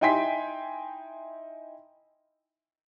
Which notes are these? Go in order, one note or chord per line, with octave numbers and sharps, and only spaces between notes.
D#4 E4 G5 G#5 C6 B6